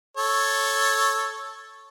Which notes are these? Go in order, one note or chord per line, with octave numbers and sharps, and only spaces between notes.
A4 C#5